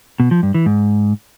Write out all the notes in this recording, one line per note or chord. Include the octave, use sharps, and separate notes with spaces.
B2
F3
G2
E3
G#2